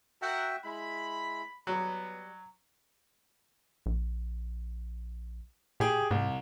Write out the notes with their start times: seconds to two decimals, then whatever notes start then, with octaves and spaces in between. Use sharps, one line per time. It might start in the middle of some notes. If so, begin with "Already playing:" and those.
0.22 F#4 A#4 E5 F#5 G5
0.64 G#3 E4 B5
1.67 F#3 G3 B3
3.86 A#1
5.80 A#2 G4 G#4 G5
6.11 C2 G#2